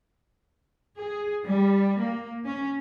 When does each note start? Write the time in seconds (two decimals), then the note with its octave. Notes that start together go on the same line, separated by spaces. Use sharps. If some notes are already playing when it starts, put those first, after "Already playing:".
0.97 G#4
1.46 G3
2.01 A#3
2.47 C#4